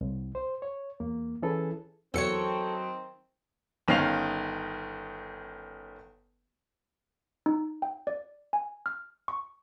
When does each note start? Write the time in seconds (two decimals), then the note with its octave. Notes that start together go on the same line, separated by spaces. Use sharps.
0.01 C2
0.35 C5
0.62 C#5
1.00 E2 A#3
1.42 E3 C#4 E4 G#4 A4 B4
2.14 E2 D#3 F#3 C4 A4 C#5 C#7
3.88 G1 D#3 C#4 F5 C7 F7
7.46 D#4
7.82 G5
8.07 D5
8.53 G#5
8.86 F6
9.28 C#6